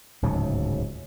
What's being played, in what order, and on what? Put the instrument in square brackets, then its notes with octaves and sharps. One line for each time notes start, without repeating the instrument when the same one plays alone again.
[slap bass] D1 C#2 G#2 F#3